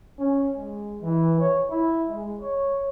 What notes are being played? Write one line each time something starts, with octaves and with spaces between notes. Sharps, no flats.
C#4
G#3
E3
C#5
E4
G#3
C#5